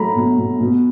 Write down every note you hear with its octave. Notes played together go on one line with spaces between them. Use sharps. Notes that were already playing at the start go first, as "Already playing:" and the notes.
Already playing: F#3 A3 A#5 B5
B2
B2
B2